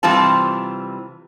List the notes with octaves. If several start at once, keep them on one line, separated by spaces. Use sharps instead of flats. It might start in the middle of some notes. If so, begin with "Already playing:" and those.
C3 E3 G3 C4 F4 A5